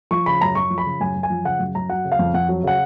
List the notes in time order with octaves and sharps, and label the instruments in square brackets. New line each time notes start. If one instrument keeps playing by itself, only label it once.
[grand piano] F3 C#6
C#3 B5
F#2 A#5
F#2 C#6
F3
B5
C#3
F#2 G#5
F#2
G#5
F3
C#3 F#5
F#2
F#2 A#5
F#3 F#5
C#3
F5
F2
F2 F#5
F#3
C#3 F#5